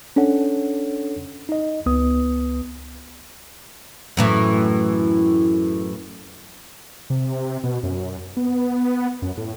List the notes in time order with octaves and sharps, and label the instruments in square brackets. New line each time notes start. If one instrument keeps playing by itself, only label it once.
[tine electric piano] C#4 D4 A4 C#5 F#5
D#4 D#5
C#2 B3 B4 D#6
[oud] F#2 A2 E3
[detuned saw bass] C3
B2
F#2
B3
F#2
A2